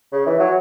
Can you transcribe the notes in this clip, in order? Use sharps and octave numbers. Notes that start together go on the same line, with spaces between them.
C#3
E3
F#3